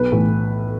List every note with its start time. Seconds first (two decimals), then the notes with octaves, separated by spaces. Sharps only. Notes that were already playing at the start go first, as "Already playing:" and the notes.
Already playing: B1 B4
0.12 A2 E3